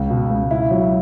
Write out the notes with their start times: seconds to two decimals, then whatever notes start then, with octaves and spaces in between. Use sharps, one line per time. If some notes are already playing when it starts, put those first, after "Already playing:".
Already playing: C#2
0.10 B2
0.30 C#2
0.51 E4
0.71 F#3